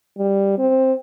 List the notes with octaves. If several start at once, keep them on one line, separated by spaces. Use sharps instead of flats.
G3
C4